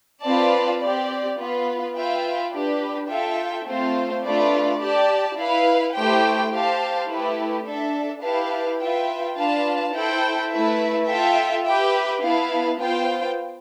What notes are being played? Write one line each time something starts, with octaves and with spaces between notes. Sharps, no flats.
C4 F4 B4 D5 A5
C4 G4 D5
B3 F4 B4
F4 B4 E5 G5
D4 G4 B4
F4 A4 E5 G5
A3 C4 F4 C5
A3 D4 F4 B4 D5
G4 D5 A5
E4 B4 F5
A3 E4 G4 C5 G5
G4 C5 F5 A5
A3 E4 G4 B4
D4 A4 E5
E4 G4 B4 F5 A5
F4 B4 E5 G5
D4 F4 B4 F5 A5
E4 A4 C5 G5
A3 E4 B4 E5
F4 A4 E5 G5
G4 B4 E5 G5
B3 E4 B4 F5 A5
B3 F4 C5 G5